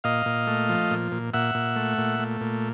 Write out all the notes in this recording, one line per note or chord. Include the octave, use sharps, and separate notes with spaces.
A#2 D#5 F5
A#2
A3
F3
A#2
A#2
A#2 E5 F#5
A#2
A3
A#2
A3
A#2